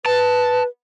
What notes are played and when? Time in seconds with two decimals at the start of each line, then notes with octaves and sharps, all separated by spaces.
0.06 B4 A5